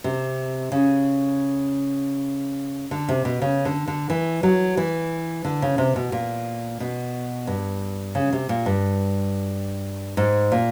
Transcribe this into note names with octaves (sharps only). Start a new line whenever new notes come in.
C3
C#3
D3
C3
B2
C#3
D3
D3
E3
F#3
E3
D3
C#3
C3
B2
A#2
B2
G2
C#3
C3
A#2
G2
G#2
A#2